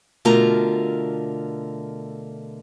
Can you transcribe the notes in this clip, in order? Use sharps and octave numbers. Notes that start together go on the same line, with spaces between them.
B2 D3 A3 F4 A#4 A#5